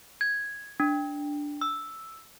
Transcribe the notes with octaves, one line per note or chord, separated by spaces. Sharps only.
G#6
D4
E6